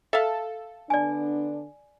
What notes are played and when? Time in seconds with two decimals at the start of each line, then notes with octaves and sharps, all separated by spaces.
0.13 A4 E5 F5
0.90 D3 B3 D4 D5 G#5